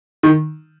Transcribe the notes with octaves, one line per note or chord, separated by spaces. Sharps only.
D#3